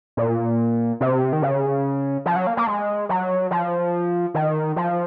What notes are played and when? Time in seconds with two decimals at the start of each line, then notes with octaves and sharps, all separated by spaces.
0.17 A#2
1.01 C3
1.33 D#3
1.42 C#3
2.26 F3
2.36 F#3
2.47 A#3
2.57 A#3
2.67 G#3
3.09 F#3
3.51 F3
4.34 D#3
4.76 F3